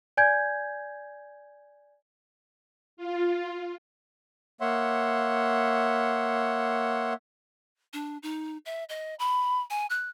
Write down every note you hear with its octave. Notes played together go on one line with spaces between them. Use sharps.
D5 G#5 G6 G#6
F4
A#3 C#5 E5 F#5 C6
D4
D#4
E5
D#5
B5
G#5
F#6